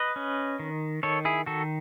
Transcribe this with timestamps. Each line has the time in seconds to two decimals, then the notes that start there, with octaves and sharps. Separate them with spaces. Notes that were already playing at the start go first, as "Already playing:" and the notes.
Already playing: B4 D#5
0.16 C#4
0.59 D#3
1.03 D#3 A4 C#5
1.25 E4 G#4
1.46 D#3 F#4 A4